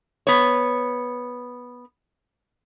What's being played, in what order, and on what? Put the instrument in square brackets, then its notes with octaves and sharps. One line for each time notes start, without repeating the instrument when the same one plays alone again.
[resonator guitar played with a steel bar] B3 C#5